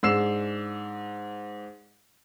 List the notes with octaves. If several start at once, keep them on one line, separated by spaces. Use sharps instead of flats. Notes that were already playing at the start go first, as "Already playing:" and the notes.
G#2 D4 E6 C7 E7